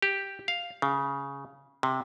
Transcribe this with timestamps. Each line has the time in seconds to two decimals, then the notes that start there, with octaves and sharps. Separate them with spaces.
0.02 G4
0.48 F5
0.82 C#3
1.83 C3